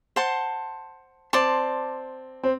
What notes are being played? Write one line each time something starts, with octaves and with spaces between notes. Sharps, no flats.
C5 F#5 A5 C6
C4 D5 A5 C6
C4